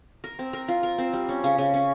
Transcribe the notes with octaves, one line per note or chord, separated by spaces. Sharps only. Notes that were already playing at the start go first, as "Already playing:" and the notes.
A#4
C4
A#4
F4
A#4
C4
G3
C#4
C#3
C#3
C#4